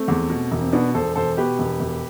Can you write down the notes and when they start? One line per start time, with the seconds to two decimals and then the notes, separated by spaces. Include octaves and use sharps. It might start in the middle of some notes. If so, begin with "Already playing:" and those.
Already playing: A3 C4
0.08 E2
0.30 B2
0.52 E1
0.61 C4
0.72 B2 B3 D4
0.94 E1 A4 C5
1.15 E1 A4 C5
1.37 B2 G4 B4
1.59 E1
1.80 E1